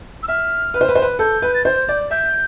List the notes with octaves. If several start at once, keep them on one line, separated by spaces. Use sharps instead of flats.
E6
E5 F6
B4
C5
B4
C5
B4
A4 G6
B4
A6
C5 G6
D5
E5 G6